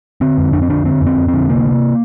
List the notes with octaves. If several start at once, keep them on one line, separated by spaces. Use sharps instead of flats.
D3 C4
F2
F2 D4
C4
D3 D4
D3 C4
F2
C4
F2
C4
D3
C3 A#3
C3